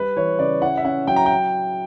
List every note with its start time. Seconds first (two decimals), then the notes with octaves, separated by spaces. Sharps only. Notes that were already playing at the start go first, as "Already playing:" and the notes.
Already playing: G3 B4
0.16 E3 C#5
0.39 C#3 D5
0.62 E4 F#5
0.77 E5
0.84 C#4 F#5
1.07 F#3 G5
1.16 A#5
1.26 G5